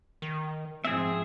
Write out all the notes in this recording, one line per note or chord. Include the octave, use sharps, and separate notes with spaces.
D#3
G#2 F3 C4 G#4 E5